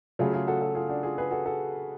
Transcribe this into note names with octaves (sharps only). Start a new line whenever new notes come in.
C#3 F#3 A3 F4 G#4
F4 G#4
F#4 A4
F#4 A4
F4 G#4
D4 F#4
F4 G#4
G#4 B4
F#4 A4
F#4 A4